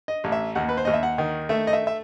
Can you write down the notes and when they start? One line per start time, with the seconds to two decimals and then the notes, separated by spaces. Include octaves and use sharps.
0.08 D#5
0.24 A1
0.32 E5
0.55 D#2 F#5
0.69 B4
0.77 C5
0.85 D#2 D#5
0.94 E5
1.03 F#5
1.18 D#3
1.49 A3 E5
1.67 D#5
1.73 E5
1.87 E5